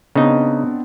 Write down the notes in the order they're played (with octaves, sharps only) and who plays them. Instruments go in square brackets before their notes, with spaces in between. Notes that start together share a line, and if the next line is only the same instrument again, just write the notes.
[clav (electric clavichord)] C#3 D#4 [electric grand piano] B3 C4 D4